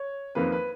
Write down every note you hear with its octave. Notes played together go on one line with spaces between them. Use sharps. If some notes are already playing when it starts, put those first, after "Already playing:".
Already playing: C#5
F2 D#3 A#3 B4
B4